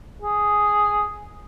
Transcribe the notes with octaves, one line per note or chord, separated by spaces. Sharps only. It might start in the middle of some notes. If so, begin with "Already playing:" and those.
G#4